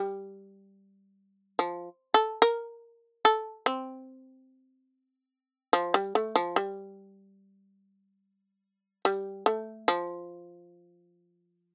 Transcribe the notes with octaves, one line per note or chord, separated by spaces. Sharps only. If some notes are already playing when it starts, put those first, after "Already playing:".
Already playing: G3
F3
A4
A#4
A4
C4
F3
G3
A3
F3
G3
G3
A3
F3